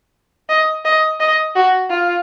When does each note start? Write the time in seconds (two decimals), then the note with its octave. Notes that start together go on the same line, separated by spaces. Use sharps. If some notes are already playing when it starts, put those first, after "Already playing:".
0.49 D#5
0.85 D#5
1.20 D#5
1.55 F#4
1.90 F4